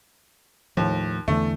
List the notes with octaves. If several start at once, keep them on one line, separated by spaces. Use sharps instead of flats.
D#2 A2 F3
E2 D3 E3 A3